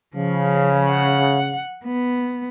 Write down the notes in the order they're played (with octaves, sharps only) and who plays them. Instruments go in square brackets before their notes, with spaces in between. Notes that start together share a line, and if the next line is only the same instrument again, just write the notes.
[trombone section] C#3 [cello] F3
[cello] F#5
B3